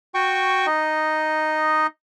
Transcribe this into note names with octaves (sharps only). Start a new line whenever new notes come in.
F#4 G5 C#6
D#4 D#5